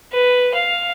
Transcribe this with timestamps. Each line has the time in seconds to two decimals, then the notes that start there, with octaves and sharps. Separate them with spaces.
0.12 B4
0.54 F5